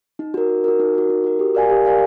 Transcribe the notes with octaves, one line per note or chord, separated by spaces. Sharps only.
D#4
F#4 A#4
D#4
F#4 A#4
D#4
F#4 A#4
D#4
F#4 A#4
G4
A#4 D5 F5 G#5
G4
A#4 D5 F5 G#5